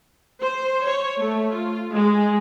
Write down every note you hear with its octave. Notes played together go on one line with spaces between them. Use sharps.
C5
C#5
A3
F4
G#3